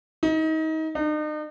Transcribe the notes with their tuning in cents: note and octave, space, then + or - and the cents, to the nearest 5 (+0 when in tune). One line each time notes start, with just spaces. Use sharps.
D#4 +30
D#4 -40